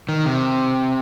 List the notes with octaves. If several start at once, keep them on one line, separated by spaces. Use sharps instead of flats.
D#3
C3